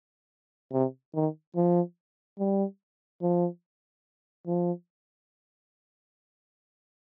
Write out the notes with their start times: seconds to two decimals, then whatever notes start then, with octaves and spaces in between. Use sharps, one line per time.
0.72 C3
1.15 D#3
1.56 F3
2.39 G3
3.22 F3
4.47 F3